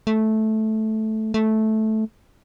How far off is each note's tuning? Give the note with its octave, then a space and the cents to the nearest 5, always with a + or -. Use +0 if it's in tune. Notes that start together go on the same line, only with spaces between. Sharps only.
A3 -10
A3 -10